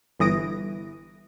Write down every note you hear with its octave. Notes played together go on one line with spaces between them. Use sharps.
G1 E3 D#6 A#6 D7